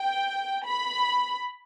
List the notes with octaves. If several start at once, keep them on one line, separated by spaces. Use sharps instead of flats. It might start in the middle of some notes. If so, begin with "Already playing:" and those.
Already playing: G5
B5